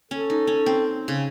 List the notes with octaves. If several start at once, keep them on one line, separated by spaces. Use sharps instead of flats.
C#4 A4
D#4
C#4
C4
C#3